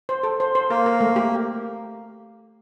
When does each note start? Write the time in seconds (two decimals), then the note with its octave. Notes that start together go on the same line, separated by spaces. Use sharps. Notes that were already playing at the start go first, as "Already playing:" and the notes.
0.09 C5
0.23 A4
0.40 C5
0.55 C5
0.70 A#3 A#4
0.86 A#4
1.01 A3
1.16 G4